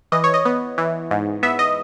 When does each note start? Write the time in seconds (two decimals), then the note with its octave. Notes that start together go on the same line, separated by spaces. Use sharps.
0.12 E3 D#5
0.24 C#5
0.34 D#5
0.45 B3
0.78 E3
1.11 G#2
1.43 B3 E5
1.59 D#5